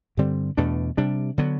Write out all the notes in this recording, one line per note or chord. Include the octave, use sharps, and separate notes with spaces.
G2 D3 G3 C4
E2 B2 A3 D4
C3 G3 D4
D3 F#3 B3